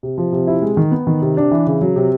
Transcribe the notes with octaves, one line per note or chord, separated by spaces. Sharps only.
C3
F3
C3
E4
G#3
D#3
B3
D#3
C3
D4
E3
C#3
F#3
C3